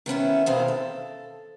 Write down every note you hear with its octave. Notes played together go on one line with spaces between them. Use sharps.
D#3 B3 C#4 E4
E2 B2 D#3 C4 C5 F5
A4